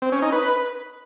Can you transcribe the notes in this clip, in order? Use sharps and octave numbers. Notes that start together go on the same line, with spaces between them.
C4
C#4
D#4
B4